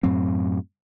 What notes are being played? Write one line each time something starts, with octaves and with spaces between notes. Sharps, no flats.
F#2 A2 F#3 C4